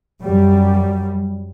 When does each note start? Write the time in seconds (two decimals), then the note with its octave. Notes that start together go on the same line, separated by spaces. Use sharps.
0.23 F#2 G3